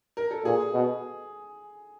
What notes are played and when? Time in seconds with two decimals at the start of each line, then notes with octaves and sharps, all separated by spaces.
0.17 A#4
0.31 A4
0.44 A#2 G#4
0.73 B2